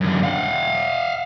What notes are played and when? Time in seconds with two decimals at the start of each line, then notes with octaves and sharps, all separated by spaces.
0.01 F#2 D3
0.23 F5 F#5